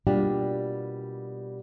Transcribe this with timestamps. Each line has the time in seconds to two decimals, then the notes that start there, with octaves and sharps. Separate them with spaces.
0.07 B2 G3 A#3 D4 F4 G4